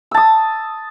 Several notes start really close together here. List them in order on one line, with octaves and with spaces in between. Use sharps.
E6 A5 D#6